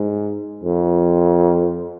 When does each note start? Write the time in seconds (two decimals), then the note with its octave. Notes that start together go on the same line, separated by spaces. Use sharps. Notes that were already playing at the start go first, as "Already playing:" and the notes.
Already playing: G#2
0.63 F2